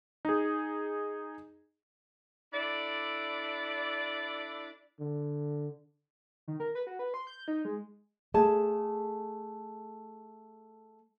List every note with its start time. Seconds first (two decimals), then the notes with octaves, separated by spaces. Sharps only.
0.25 D#4 G#4
2.53 D4 E4 A4 D5
5.00 D3
6.48 D#3
6.60 A#4
6.75 B4
6.87 F#4
6.99 B4
7.14 C6
7.27 G6
7.48 D#4
7.65 G#3
8.34 A3 G#4 A5